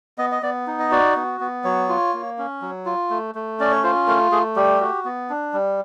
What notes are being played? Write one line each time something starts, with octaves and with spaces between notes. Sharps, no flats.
B3 D#5
D#5
B3 D5
D#4
D#5
F#4 D5
B3
B3
F#3 C#5
F4
A#3
C#4
F#3
F4
A3
A3
C#4 D5
C#5
F4 C5
A3 A#4
A3 G#4
G3 G4
F#4
B3
D4
G3